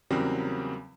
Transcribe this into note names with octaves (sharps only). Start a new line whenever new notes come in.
E2 C#3 F#3 G3 A#3 C4